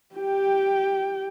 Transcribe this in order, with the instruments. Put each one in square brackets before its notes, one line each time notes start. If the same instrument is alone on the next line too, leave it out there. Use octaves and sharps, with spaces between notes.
[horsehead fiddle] G4 G5